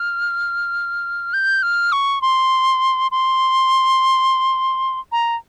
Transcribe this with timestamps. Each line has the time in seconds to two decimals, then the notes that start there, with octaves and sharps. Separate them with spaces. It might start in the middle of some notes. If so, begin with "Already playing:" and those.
Already playing: F6
1.33 G6
1.62 F6
1.92 C#6
2.22 C6
3.11 C6
5.12 A#5